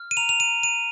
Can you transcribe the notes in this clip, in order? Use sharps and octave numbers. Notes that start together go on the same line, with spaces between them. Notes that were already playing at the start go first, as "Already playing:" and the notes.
Already playing: F6
D#7
A#5 F7
F7
D#7
A#5
D#7